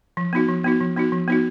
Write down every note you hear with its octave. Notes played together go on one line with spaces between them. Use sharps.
F3
B3 D#4 F#4
F3
B3 D#4 F#4
F3
B3 D#4 F#4
F3
B3 D#4 F#4